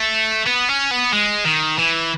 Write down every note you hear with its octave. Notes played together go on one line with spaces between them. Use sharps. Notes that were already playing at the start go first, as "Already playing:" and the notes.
Already playing: A3
B3
C#4
B3
G#3
D#3
E3